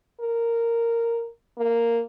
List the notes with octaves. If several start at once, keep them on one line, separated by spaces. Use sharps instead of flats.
A#4
A#3